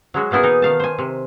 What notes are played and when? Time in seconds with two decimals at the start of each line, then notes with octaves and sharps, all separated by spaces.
0.14 F#3 G#3 F#4
0.31 B2 A#3 B3 E4 G#4
0.43 E3 D#4
0.62 D#3 F5 A5
0.80 C5 G#5
0.98 C3